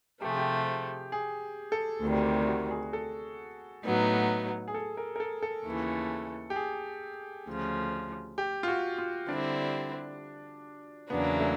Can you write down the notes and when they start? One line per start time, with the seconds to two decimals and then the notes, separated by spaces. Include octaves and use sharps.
0.21 C3 F3 A3 G4
0.30 G#4
0.38 G4
1.12 G#4
1.72 A4
2.02 D2 C3 D#3 G3
2.47 F#4
2.71 G#4
2.93 A4
3.83 A2 F#3 B3 D#4
4.68 G#4
4.74 A4
4.97 A#4
5.16 A#4
5.20 A4
5.43 A4
5.65 D#2 C#3 E3 A3
6.50 G4
6.56 G#4
7.47 D2 C#3 F3
8.38 G4
8.63 F4
8.68 F#4
8.98 F4
9.29 D3 G3 C4 D4 E4
11.09 E2 C#3 F#3 A#3 B3 D4
11.40 A3